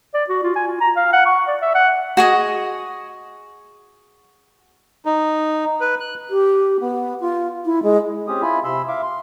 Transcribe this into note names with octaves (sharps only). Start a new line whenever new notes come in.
D5
F#4
F4
G#5
F4
A#5
F5
F#5
C#6
D5
E5
F#5
F#4 G#4 D#5
D#4
B4
F#6
G4
B3
F4
E4
G#3
C4 C#4 G4 G#4 D#6
E4 F4 G#5 B5
C3 B5 C6 E6
E5 F5 D6
C6